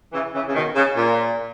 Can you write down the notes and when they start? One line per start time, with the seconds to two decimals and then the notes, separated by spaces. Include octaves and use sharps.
0.13 C#3 E3
0.34 C#3 E3
0.49 C#3
0.55 B2 D#3
0.76 C#3
0.96 A#2